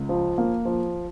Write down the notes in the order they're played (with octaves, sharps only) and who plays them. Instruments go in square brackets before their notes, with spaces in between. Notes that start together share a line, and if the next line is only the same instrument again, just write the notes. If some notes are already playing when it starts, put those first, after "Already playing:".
Already playing: [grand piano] C#2
F3
A#3
F3